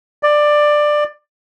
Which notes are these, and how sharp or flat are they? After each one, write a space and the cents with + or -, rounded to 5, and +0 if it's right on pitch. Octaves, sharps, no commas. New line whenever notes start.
D5 +15